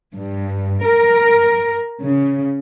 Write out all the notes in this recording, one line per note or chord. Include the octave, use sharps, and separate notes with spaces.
G2
A#4
C#3